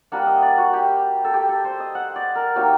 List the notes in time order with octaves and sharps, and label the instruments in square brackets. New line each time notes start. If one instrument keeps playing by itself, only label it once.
[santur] G3 A#3 D4 F#5
D#5
D5
F#4
G4
A4
G4
A4
C5
D#5
F#5
D5
A#4
F#3 A#3 D#4 G4